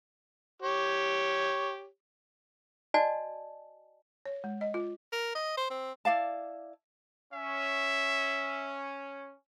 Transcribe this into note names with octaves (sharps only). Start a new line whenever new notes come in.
G4 C#5
F#4 D5 D#5 G#5 A5
C#5
G#3
D#5
F4
A#4
D#5
C5
C4
E4 D5 F5 A5
C#4 E5